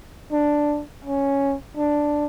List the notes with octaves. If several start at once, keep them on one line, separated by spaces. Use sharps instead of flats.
D4
C#4
D4